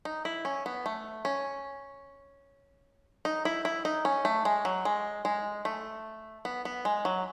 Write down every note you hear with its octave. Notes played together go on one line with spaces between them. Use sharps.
D#4
E4
C#4
B3
A3
C#4
D#4
E4
E4
D#4
C#4
A3
G#3
F#3
G#3
G#3
A3
B3
B3
G#3
F#3